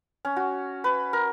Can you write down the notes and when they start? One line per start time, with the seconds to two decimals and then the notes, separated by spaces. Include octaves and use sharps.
0.25 C#4
0.36 F#4
0.84 B4
1.13 A#4